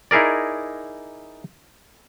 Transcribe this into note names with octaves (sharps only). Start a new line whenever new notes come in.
D#4 E4 G#4 A#4 D5